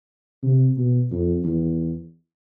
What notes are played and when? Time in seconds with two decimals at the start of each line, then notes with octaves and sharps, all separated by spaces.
0.43 C3
0.77 B2
1.11 F2
1.44 E2